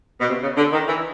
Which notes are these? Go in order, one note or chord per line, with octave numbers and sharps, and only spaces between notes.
B2
C3
C#3
D3
D#3
E3